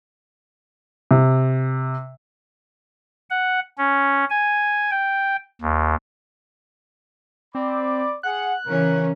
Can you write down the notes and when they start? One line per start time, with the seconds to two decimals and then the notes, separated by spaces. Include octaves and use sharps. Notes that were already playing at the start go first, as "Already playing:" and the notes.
1.11 C3
3.30 F#5
3.78 C#4
4.30 G#5
4.91 G5
5.62 D#2
7.55 C4 D5 B5 D6
8.23 G#4 F#5 F#6
8.66 C#3 E3 C#4 A#4